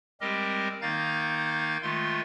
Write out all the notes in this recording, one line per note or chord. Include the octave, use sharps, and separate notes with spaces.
G3 G#3 C4 G4 A#4 D#5
D#3 A#3 D#4 F5 G6 A6
D#3 G#3 A3 F4 C6